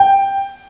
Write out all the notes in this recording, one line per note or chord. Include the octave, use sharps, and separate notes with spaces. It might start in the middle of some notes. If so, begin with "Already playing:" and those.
Already playing: G5